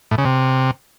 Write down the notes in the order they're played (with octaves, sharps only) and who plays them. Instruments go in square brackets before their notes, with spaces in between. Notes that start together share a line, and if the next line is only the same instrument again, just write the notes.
[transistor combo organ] A2
C#3
C3